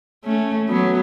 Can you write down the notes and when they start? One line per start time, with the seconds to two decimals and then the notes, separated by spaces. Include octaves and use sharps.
0.25 A3 C#4
0.69 F#3 B3